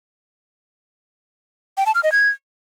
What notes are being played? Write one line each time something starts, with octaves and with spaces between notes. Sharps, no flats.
G5
A5
F6
D#5
G#6